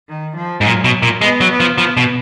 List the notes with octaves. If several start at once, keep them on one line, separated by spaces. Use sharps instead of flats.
D#3
F3
G#2
A#2 F#3
B2
A#2
G#3 B3
F#3
B3
F3
F3 B3
B2